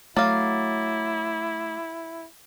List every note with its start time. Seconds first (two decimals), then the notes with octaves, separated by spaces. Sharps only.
0.17 F#3 A3 E4 F5 A#5 D6 A6